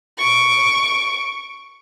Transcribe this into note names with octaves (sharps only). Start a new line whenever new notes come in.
C#6 D7